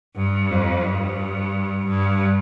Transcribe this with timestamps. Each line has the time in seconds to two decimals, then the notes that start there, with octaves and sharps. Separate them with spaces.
0.16 G2
0.51 F2
0.84 G2
1.87 G2